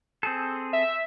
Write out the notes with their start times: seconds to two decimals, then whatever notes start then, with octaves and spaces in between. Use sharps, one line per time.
0.23 C4 G#4 A4
0.73 E5